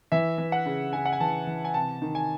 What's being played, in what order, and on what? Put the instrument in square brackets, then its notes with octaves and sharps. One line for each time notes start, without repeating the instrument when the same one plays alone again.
[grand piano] E3 E5
E3
F#5
C#3
C#3 G#5
F#5
G#5
E3 A5
E3
G#5
C3 A5
D#3
G#5